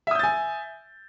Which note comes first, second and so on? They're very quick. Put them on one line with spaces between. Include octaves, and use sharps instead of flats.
E5 D#6 G6 A6 G#5